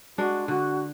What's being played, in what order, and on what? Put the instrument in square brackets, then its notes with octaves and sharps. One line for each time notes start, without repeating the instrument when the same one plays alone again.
[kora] G#3 D4 [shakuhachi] F#4
[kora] D3 [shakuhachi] F#4